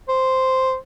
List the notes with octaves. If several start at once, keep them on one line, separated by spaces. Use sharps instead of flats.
C5